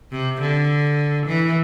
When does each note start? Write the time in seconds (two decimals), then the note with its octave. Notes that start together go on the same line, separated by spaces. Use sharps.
0.12 C3
0.42 D3
1.27 E3